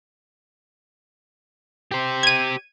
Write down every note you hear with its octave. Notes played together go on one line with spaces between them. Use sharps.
G4 C5
G#6 D#7